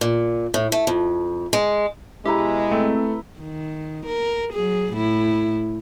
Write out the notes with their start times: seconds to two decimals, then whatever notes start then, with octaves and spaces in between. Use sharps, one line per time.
0.01 A#2
0.54 A2
0.72 A3
0.87 F2
1.53 G#3
2.26 B2 G#3 E4 G4 B4 A#5
2.71 A3 C4
3.40 D#3
4.06 A#4
4.53 F#3 G#4
4.94 A2 E4